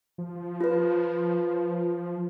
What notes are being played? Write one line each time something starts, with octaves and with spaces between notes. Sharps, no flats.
F3
F4 B4